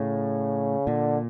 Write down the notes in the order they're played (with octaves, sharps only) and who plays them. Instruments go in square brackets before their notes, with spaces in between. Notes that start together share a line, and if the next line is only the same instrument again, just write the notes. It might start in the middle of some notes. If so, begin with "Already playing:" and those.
Already playing: [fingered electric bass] A2 [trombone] C#3
[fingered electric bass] A#2 [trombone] D3